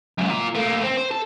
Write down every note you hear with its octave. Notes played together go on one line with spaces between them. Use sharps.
C#2 F#2
F4 A#4
A3 A#3
C4
C5
A4